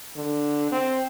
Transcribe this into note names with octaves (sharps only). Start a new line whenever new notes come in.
D3
C4